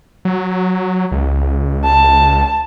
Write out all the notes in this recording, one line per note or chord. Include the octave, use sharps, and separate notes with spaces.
F#3
C#2
A5